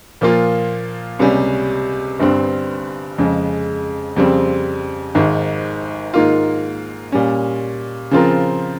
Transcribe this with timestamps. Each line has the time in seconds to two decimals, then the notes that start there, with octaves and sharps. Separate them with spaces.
0.21 A#2 F3 A#3 F4
1.19 C#2 C3 G3 C#4
2.19 G1 G2 G3 C4
3.18 F2 C#3 G#3
4.16 F2 C#3 G3 C4
5.15 G#1 G#2 D#3
6.14 G#2 D#3 A#3 F4
7.12 A#2 G3 C#4
8.11 C#3 F3 C4 F4 A#4